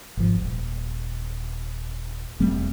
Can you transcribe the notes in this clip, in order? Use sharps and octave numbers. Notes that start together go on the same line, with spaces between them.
G#1 F3
D#1
E1 G3 A3 C4